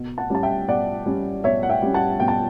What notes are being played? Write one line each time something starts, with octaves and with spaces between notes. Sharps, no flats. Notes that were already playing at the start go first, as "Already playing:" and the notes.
Already playing: B2
F#5 A5
G3 C#4 A5
E5 G5
B2 D5 F#5
G3 C#4
B2 C#5 E5
F#5
E5 G5
G3 C#4
F#5 A5
B2 G5
A5